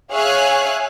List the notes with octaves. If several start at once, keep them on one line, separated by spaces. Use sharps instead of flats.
G#4 C#5 E5 F5 G#5 F#6